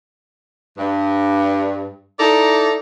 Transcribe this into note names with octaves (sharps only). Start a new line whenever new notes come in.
G2
D#4 E4 A4 D5 A#5